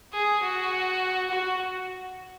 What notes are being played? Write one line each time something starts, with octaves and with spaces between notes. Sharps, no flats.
G#4
F#4
F#4